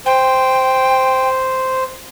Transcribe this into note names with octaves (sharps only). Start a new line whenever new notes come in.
C5 G5